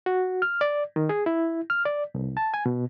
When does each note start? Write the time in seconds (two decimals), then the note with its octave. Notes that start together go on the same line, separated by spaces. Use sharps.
0.06 F#4
0.42 F6
0.61 D5
0.96 D#3
1.09 G#4
1.26 E4
1.70 F6
1.85 D5
2.14 C2
2.37 A5
2.54 G#5
2.66 B2